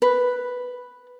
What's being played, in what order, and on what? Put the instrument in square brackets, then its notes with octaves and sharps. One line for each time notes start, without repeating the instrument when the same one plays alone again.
[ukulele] B4